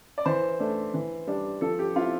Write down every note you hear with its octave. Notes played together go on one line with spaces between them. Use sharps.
D5
E3 C5
A3 D4
E3
G3 D4
F3 A4
G4
C4 E4 F4